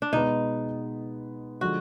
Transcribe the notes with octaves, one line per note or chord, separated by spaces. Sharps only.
D4
B2 G#3 B3 D#4
D3 F3 G#3 F#4